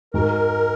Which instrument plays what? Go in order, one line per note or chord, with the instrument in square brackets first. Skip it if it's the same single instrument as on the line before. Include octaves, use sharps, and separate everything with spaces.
[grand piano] G#2 D#3 G#3 F#4 [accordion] A#4